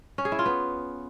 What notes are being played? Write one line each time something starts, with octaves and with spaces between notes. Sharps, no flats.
C#4
G#4
E4
F4
B3